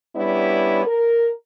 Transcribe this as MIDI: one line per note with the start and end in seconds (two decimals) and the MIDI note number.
0.15 0.85 55
0.15 0.85 59
0.15 0.85 61
0.15 0.85 62
0.15 0.85 64
0.85 1.30 70